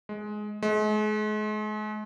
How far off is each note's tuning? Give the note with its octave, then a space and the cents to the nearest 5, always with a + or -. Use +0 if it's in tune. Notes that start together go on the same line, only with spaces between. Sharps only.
G#3 +15
G#3 +40